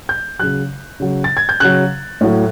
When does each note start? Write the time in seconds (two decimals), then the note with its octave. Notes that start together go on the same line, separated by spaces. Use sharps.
0.09 G6
0.39 C#3 F#3 F#6
1.00 C#3 F#3
1.24 A6
1.37 G#6
1.49 G6
1.60 C#3 F#3 F#6
2.21 A2 F#3